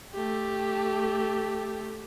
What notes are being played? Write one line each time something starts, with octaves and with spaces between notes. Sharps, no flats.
A3 G4